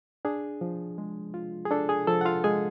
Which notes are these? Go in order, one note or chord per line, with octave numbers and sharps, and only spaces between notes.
D4 G#4
F3
G#3
F4
G#4
D4 A4
G#4
F3 A4
F#5
F4 F5
G#3 G#4 G#5